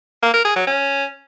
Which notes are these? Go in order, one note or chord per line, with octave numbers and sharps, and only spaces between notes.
A#3
A#4
G#4
F#3
C#4